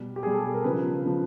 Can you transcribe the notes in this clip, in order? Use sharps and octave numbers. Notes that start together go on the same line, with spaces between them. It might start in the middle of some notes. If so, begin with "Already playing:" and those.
Already playing: B2 G3
G4
B2 G3 G#4
A4
A4
A#4
C#3 F3 B4
C#3 F3